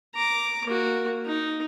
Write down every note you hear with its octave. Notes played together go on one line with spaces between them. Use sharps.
A#5 D6
A#3 F#4
D#4